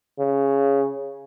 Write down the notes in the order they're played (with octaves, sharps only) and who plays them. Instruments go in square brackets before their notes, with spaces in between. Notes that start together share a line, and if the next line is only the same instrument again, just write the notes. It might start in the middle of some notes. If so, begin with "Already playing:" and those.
[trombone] C#3